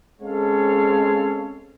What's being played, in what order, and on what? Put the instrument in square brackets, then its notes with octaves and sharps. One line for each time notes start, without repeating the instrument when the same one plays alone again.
[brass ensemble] G#3 C4 C#4 A4 C#5 F5